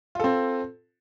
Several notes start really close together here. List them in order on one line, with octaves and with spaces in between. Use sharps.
F4 A4 C4